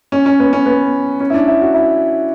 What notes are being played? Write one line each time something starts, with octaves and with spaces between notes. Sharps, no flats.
C#4
C#4
B3
C#4
B3
C#4
E4
D4
E4
F#4
E4